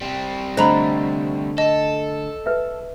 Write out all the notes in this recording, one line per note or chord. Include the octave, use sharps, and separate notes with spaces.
G3 C4
D3 A3 C5 D#5 A#5 B5
A4 D#5
B4 E5